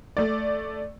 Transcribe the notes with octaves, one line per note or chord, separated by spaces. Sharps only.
A3 D5